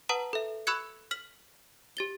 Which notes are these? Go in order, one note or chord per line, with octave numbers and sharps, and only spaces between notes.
B4 F#5 A5 A#5 D#6
A4 E5
B5 C#6 E6 F#6 G#6 C#7
F6 B6 F#7
G4 A6 G7